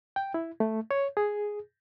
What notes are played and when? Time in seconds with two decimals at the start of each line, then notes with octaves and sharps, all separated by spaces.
0.16 G5
0.34 E4
0.60 A3
0.91 C#5
1.17 G#4